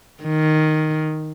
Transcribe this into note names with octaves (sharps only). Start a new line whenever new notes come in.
D#3